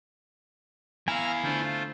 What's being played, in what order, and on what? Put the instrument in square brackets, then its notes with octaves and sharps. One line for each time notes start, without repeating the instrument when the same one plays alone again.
[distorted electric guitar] B3 E4 [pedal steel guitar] F5 G#5 [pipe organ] A#5 E6 F6
[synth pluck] D3 D4 [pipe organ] A3 F4 C5